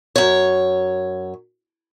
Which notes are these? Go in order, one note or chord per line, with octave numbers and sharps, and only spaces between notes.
F#2 C#5